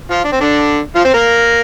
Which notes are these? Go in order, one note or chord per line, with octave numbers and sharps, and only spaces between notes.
F3 F4
D4
C4
D3 D4
F3 F4
C4 C5
A#3 A#4